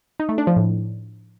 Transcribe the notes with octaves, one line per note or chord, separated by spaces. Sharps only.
D#4
A3
D4
F3
A2